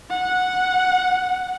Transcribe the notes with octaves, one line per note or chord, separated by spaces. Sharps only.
F#5